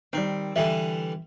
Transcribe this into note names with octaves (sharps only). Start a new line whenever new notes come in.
D#3 G3 C4
D3 E3 G3 E5